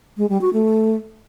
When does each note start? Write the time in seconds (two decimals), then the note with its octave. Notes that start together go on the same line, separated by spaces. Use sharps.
0.17 G#3
0.29 G3
0.41 F#4
0.53 A3